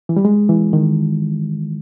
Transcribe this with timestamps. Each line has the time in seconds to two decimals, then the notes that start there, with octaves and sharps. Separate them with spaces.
0.09 E3
0.16 G3
0.25 G#3
0.49 E3
0.73 D#3